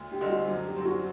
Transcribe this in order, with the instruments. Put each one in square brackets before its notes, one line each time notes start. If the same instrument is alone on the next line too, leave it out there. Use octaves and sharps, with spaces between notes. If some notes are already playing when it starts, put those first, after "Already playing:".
Already playing: [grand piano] D2
[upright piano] G4
[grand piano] D3 G3 C4 D#4
[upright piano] F#4
[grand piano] F#2 [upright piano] F#4
[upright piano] G4
[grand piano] D3 F#3 C4
[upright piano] F#4